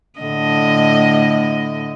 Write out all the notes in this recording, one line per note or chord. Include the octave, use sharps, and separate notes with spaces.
A2 D3 D#5